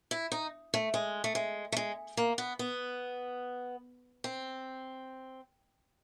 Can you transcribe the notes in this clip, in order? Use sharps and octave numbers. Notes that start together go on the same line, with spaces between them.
E4
D#4
A3
G#3
A3
G#3
A3
G#3
A#3
B3
B3
C4